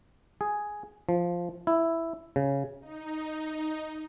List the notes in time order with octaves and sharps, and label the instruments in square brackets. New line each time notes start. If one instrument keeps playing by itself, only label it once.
[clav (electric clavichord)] G#4
F3
E4
C#3
[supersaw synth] D#4